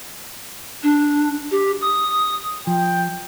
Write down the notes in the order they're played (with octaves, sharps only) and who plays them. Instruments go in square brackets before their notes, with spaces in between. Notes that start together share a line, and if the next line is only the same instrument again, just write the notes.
[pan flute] D4
G4
D#6
[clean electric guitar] F3 [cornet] G5